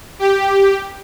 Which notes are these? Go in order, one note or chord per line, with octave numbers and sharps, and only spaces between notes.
G4